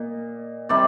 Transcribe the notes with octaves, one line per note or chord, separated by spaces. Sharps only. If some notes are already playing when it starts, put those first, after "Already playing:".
Already playing: A#2 D#5
C3 G3 C4 D5